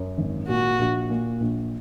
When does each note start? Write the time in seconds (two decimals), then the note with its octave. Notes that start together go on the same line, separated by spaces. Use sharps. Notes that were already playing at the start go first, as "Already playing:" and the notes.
Already playing: F#2
0.18 G#1
0.48 A#2 F#4
0.79 A#1
1.10 A#2
1.40 A#1